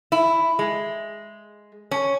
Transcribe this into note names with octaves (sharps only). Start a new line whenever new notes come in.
E4
G#3
C#4